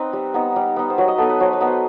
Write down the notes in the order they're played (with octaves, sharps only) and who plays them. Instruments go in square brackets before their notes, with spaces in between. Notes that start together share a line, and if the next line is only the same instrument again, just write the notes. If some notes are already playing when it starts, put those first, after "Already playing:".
Already playing: [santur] C4 D#4 B4
G3
B3 D#4
G3
B3 D#4
C5
F#3 B4
D#5
B3 D#4 A4
B4
F#3 C5
B4
B3 D#4
C5